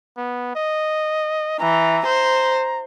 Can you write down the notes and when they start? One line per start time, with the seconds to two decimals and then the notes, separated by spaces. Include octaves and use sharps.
0.17 B3
0.55 D#5
1.60 E3 A#5
2.05 C5